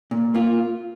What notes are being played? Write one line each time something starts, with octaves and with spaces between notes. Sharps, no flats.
A#2
A#3 F4